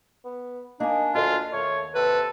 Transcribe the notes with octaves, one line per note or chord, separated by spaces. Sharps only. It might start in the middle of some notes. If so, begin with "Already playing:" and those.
B3
A#3 D4 D#4 G#5
D2 F4 A4 D#5
D#2 A3 C#5
C3 A4 B4